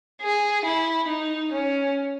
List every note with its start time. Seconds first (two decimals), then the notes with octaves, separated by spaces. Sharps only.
0.21 G#4
0.65 E4
1.08 D#4
1.52 C#4